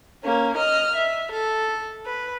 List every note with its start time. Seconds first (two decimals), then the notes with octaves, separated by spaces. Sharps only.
0.24 A#3 C#4
0.57 D#5 F6
0.95 E5
1.31 A4
2.06 B4